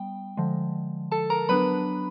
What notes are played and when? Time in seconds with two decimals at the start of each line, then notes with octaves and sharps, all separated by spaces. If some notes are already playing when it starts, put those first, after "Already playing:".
Already playing: G3 B3 G5
0.37 D3 F3 G#3
1.12 A4 A5
1.30 A#4 A#5
1.49 F#3 B3 D4 B4 B5